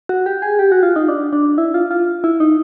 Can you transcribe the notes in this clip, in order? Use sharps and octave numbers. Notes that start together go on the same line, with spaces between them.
F#4
G4
G#4
G4
F#4
F4
D#4
D4
D4
E4
F4
F4
E4
D#4